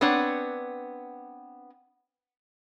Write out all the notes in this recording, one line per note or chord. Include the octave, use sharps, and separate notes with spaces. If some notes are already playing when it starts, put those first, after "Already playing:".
B3 C4 D4 C#5 F#5